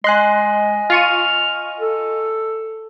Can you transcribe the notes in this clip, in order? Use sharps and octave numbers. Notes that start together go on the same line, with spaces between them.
G#3 D#5 G#5 C6 F#6
F4 C#6 F6 D#7
A4